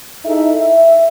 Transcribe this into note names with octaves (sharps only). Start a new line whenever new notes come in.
D#4 E4 G#4 A4 E5
E5